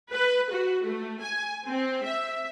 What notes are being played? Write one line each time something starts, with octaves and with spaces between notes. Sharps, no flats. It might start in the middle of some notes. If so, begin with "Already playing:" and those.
B4
F#4
A3
G#5
C4
E5